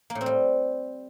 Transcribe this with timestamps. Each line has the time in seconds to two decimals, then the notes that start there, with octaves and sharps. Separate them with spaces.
0.10 A#3
0.15 A2
0.21 C4
0.26 G3